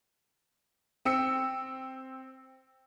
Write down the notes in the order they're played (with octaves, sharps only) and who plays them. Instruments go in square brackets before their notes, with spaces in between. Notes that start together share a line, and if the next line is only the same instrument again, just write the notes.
[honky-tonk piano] C4 E6 C#7